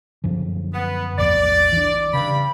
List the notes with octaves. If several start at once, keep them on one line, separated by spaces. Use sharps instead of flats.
F#2 D3 F3
B3
A#1 E2 D5
E3 D4
G2 C#3 B5